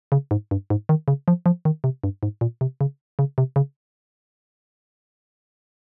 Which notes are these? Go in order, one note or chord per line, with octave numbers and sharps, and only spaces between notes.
C#3
G#2
G2
G#2
D#3
C#3
F3
F3
D#3
C3
G2
G#2
A#2
C3
C#3
C#3
C3
C#3